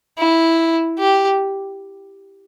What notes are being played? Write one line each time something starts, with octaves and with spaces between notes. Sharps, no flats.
E4
G4